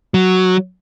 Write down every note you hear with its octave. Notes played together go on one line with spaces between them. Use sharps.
F#3